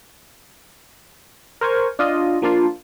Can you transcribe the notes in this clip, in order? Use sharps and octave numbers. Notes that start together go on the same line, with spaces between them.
A#4 C5 G#5 C#6
D4 F4 D#5
F3 A#3 D4 F4